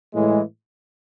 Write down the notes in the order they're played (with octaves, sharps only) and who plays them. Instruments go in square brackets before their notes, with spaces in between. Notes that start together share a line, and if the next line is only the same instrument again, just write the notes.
[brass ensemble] A2 E3 G#3